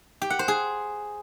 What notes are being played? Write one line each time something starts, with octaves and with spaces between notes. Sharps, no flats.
G4
F#5
C5
G#4